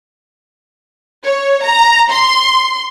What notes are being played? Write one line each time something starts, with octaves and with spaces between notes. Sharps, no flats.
C#5
A#5
C6